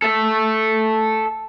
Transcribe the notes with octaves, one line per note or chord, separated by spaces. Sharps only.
A4 E5